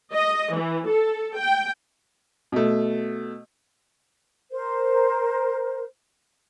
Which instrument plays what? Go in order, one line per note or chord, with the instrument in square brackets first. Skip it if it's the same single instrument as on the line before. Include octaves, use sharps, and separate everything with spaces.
[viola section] D#5
E3
A4
G5
[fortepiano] B2 A3
[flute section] A#4 C5